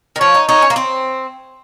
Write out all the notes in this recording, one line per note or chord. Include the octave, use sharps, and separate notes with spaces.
D#3
F3 C#5
D#4
D#4 C#5
C#4
A#3
C4